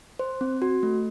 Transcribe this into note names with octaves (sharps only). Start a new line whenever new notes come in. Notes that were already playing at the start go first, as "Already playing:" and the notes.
C5
C4
F#4
A3